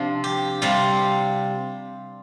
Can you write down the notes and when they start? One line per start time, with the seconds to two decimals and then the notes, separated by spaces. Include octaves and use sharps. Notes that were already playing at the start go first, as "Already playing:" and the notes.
Already playing: C3 F3 C4 D4
0.24 G4
0.62 C3 G3 F4